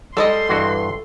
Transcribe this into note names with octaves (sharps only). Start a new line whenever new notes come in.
G3 G#3 A4 D#5 C6
G2 E3 F#4